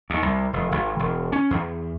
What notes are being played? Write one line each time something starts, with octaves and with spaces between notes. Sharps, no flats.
D#2
C2
F1
G#1
E1
C#4
E2